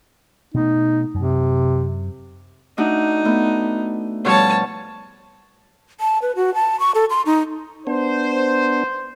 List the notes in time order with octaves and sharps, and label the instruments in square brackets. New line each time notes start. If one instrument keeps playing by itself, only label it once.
[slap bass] B2 A3 [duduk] D#4
[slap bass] F#2 [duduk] C3
[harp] A3 D4 F#4 [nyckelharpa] D#4
[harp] A3 B3
[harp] B2 F3 G3 [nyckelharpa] C#5 A5
[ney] A5
B4
F#4
A5
C#6
A4
C6
D#4
[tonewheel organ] B3 D4 [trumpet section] C5